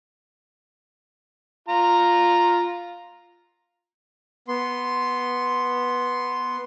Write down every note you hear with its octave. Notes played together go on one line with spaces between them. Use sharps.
F4 A#5
B3 C6